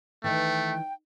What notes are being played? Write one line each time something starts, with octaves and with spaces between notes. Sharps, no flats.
D#3 E3 A3 G5